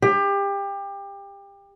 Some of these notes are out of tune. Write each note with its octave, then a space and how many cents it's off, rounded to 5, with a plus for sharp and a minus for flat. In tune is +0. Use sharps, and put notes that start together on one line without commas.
G4 +25